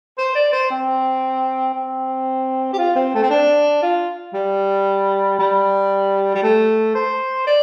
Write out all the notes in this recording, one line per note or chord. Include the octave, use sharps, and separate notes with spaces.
C5
D5
C5
C4
C4
G4
F4
C4
A3
C4
D4
F4
G3
G3
G3
A3
C5
D5